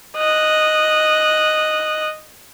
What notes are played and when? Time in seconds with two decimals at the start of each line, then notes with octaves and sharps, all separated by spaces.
0.17 D#5 F#6